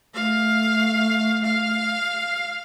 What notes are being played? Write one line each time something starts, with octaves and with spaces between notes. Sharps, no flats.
A3 F5
F5